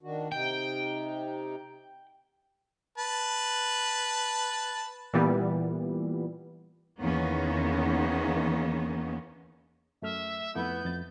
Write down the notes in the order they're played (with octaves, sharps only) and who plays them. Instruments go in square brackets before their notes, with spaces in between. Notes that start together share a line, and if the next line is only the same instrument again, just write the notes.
[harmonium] D#3 D4 F#4
[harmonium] C3 D#4 [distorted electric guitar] G5
[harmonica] B4 A5
[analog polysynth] A#2 E3 G3 B3
[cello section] E2 D#3 A#3 B3 C#4 D#4
[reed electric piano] F#2 A3 F6 [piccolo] E5
[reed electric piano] F2 A3 E4 [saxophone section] B3 [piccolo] G6
[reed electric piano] F2 A6